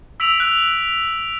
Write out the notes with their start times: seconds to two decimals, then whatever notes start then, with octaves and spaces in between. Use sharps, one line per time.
0.20 E6 B6 D7 F7 F#7
0.40 F#6